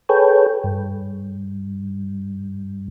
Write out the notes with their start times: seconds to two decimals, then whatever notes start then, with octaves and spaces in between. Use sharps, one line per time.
0.09 G#4 A4 B4 C#5 G5
0.64 G2